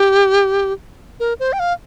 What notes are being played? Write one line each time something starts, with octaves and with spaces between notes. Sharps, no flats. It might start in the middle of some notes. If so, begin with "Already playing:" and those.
Already playing: G4
A#4
C5
G5
F5